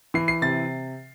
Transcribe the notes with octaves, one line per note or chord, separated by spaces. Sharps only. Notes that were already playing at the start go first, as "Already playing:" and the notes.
E3 C7
C7
C3 A6